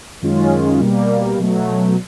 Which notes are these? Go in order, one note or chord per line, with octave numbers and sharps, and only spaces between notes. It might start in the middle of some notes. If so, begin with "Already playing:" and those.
F#2 D#3 G#3 C#4 F4
B2 G3 A#3
B2 F#3 A3